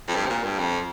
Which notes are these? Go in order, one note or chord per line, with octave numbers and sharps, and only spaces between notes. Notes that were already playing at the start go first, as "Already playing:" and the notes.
F2
G2
C3
A#2
G2
F2